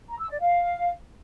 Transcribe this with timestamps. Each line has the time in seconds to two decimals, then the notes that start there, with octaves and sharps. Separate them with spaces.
0.09 A#5
0.19 E6
0.29 D5
0.40 F5